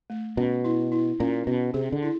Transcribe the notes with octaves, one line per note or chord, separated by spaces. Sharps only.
A3
B2 C#4
E4
E4
A#2 C#4
B2 C#4
C3 G#4
D3
E4